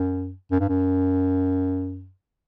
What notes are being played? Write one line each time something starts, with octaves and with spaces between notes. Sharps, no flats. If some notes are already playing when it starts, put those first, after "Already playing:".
Already playing: F#2
F#2
G2
F#2